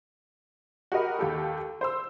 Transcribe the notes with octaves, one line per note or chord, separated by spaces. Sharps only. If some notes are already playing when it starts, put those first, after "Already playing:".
F#4 G4 A#4 D#5 B5
D#2 G4 A4
C5 C6 E6